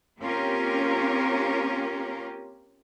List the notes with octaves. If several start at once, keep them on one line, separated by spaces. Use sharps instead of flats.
A#3 C4 C#4 F4 G4 A#4